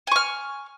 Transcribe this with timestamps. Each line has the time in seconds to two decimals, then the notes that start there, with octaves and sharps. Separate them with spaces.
0.07 G#5
0.12 C#6
0.16 F6